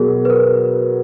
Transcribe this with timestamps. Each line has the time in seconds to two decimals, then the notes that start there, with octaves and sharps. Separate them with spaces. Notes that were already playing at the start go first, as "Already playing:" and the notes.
Already playing: B2 F#3 B3 G#4 A#4
0.25 B4
0.30 A#4